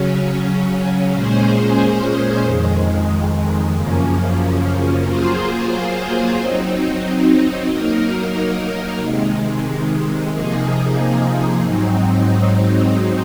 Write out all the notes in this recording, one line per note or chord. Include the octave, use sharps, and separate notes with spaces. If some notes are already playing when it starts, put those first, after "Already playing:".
Already playing: C#3 F#3 C#4
A#2 G#3 C#4 G#4 C5
F2 D#3 G#3
F#2 C#3 F3 A#3 C#4
F#3 A#3 F4 G#4 C5
F#3 C4 D#4
F#3 A#3 D#4 A#4
C3 D#3 G#3
C3 F3 A#3 D#4 G#4
G#2 F#3 C4 D#4